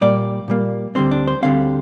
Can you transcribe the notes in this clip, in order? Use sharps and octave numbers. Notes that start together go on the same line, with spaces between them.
A#2 G3 A#3 D5
A#2 G3 A#3
D2 D3 G3 C4 C5
D4
C5
D2 D3 G3 C4 F5